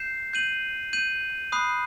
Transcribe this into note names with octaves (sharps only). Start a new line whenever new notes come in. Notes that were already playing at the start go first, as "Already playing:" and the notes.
Already playing: G6 C7 E7
G6 D#7 F#7
G6 D#7 F#7
B5 D#6 F#6 C7